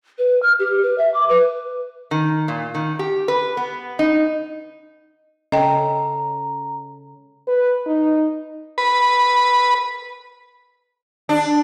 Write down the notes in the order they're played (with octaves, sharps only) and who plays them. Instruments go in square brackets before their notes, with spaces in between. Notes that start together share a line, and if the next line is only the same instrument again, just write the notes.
[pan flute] B4
F6
G4
B4
E5
D6
B4
[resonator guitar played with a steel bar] D#3
A#2
D#3
G4
B4
B3
D#4
[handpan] C#3 C#4 A4 [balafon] D#5 G5 [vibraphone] A#5
[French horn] B4
D#4
[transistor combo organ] B4
[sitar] D4